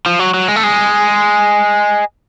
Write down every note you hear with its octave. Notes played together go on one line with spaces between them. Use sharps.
F3
F#3
F#3
G#3
A3
G#3